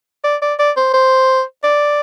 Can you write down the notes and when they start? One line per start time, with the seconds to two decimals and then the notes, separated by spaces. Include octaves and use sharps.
0.24 D5
0.42 D5
0.59 D5
0.77 C5
0.94 C5
1.64 D5